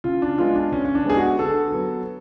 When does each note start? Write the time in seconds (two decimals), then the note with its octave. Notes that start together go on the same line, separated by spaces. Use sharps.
0.04 C#3 F4
0.22 D4
0.38 G#3 B3 F4
0.55 D4
0.71 C#3 C#4
0.84 C#4
0.95 D4
1.05 G#3 B3 G#4
1.17 F#4
1.39 D3 A4
1.72 F#3 B3